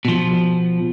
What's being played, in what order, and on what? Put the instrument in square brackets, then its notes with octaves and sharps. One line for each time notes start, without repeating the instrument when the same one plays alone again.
[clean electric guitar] B2 F3